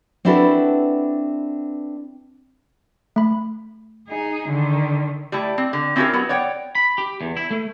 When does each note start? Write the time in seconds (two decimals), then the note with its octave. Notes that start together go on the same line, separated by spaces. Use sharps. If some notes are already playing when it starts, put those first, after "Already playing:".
0.25 C4 D4 E4 F#4 A4 B4
3.16 A3 B5
4.08 D#4 G#4
4.50 D3 D#3
5.32 G3 A3 E4
5.58 C4
5.73 D3
5.96 C4 C#4 E4 F4 G4 A#4
6.13 F#3 B3
6.29 C#5 D5 F#5 G5
6.75 B5
6.98 G4
7.21 E2
7.37 E4
7.51 A3